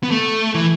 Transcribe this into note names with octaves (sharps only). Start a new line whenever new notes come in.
B3
A3
E3